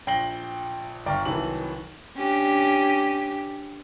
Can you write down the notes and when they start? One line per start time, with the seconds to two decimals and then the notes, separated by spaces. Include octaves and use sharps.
0.07 A#1 G5 A#6 C7 F#7 G7
1.06 G1 D5 G5 A#5 C#6 F6
1.25 C2 D#3 E3 F#3 A5 F#7
2.17 C#4 D4 G4